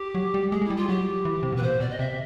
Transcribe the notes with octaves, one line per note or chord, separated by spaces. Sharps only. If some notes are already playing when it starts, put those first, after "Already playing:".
Already playing: G4
F#3
G3
G#3 G#4
G#3 E4
G3
F4
F#3 G4
E3
C3
B2 B4
A#2 C5
B2 D5
D#5
C3 E5